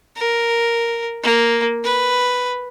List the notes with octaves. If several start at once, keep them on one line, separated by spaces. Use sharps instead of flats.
A#4
A#3
B4